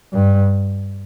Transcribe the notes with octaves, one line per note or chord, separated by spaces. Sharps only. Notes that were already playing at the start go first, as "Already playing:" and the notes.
G2